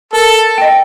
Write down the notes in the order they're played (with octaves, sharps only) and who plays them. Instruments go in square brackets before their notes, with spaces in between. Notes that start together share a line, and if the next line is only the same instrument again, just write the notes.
[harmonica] A4 [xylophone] A#4
[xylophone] D#5 G5